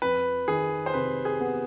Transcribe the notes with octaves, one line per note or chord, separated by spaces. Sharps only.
F2 B4
D#3 G#4
C5
C3 B4
G#4
B3